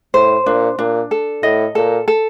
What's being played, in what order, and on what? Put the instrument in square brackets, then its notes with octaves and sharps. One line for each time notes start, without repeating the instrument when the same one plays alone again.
[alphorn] A2 [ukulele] C5
[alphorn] A#2 [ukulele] D4
[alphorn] A#2 [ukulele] D4
[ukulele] A4
[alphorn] A2 [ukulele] D#5
[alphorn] A#2 [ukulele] A4
[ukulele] A4